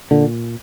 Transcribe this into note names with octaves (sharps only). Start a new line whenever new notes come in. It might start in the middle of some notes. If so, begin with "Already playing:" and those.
A#2 D3